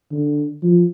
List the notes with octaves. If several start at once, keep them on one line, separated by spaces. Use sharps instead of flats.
D3
F3